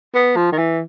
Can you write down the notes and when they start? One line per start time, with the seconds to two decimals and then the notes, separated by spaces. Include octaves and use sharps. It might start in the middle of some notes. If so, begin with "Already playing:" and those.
0.15 B3
0.36 F3
0.52 D#3
0.58 E3